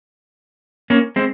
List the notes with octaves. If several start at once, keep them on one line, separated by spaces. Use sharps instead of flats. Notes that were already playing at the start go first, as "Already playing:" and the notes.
A#3 C#4
G#3 C4